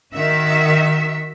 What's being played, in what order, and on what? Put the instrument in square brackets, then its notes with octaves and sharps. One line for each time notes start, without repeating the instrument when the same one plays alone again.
[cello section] D#3 F#4 E5